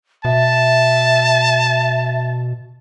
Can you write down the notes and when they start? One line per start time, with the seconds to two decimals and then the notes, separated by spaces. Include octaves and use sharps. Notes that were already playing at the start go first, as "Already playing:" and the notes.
0.25 B2 E5 A5